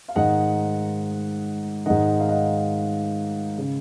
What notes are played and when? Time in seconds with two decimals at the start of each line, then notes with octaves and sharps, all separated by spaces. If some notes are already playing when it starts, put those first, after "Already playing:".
0.08 F5
0.15 G#2 D#3 D#5 F#5
1.86 G#2 D#3 D#5 F#5
2.20 F5
2.29 D#5 F#5
3.58 C#3